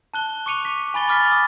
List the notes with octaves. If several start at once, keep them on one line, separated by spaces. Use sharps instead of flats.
A5 F#6 G7
C#6 D6 C#7 D#7 F7
B6
G#5 B5 A6 G7
B5 D6 F6 A6 B6
D#6